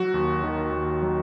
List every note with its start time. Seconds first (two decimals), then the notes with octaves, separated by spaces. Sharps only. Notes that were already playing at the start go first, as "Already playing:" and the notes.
Already playing: F#3 F#4
0.14 D#2
0.44 D#3
0.72 D#2
1.02 F#3